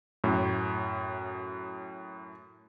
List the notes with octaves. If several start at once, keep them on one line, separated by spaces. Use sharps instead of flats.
F#2 A2